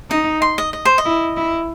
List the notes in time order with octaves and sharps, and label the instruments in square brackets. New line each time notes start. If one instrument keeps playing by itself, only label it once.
[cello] D#4 [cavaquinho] D#5
[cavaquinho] C6
D#5
D#5
C5
D#5
[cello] E4
E4